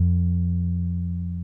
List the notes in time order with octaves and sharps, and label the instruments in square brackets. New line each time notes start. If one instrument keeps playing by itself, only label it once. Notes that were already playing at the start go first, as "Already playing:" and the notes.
Already playing: [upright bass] F2